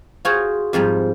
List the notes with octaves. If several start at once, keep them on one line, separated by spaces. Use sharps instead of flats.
F4 F#4 G#4 C5 C#5
F2 G#2 F3 G3